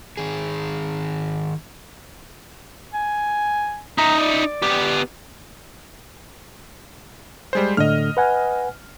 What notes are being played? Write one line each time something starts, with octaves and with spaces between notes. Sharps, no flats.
D#3 G#4
G#5
D#4 E5 A#5
D5
B3 G4
G3 G#3 C5
A2 D3 A3 D#5 F6
B4 F#5 G#5